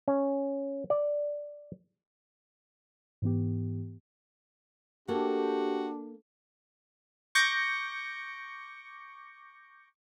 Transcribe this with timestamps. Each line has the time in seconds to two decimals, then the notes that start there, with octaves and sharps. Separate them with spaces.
0.08 C#4
0.90 D5
3.22 G#2 E3 B3 G4
5.08 A#3 D4 F#4 G4 A4
7.35 C#6 D6 G6 A#6 C#7